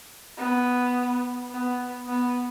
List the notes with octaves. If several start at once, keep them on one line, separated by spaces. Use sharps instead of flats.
B3
B3
B3